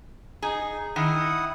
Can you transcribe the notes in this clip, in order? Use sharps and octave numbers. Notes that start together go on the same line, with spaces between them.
D#4 G#4
D#3 E4 F#5 D#6